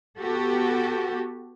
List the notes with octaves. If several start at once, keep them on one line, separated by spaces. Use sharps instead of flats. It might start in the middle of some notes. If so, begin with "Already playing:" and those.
B3 F#4 G4 A4